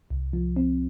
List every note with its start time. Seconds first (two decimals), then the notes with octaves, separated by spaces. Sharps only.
0.10 C2
0.33 F3
0.56 C4